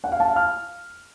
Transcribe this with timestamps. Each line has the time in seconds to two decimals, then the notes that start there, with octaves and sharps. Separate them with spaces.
0.04 F#5
0.12 F5
0.20 A5
0.28 F5
0.36 F6